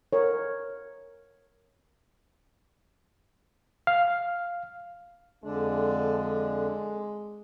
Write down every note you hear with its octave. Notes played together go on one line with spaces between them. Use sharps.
A#4 C#5
F5
F2 D3 G#3 D4